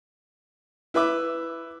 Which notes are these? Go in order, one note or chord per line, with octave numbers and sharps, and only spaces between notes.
E4 B4 E5 D6